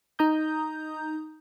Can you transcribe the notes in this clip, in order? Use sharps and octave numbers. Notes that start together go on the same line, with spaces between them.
D#4 A#5 D#6 G6